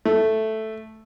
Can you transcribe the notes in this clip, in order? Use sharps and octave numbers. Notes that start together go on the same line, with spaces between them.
A3